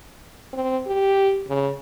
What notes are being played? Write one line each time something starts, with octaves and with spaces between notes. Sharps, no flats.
C4
G4
C#3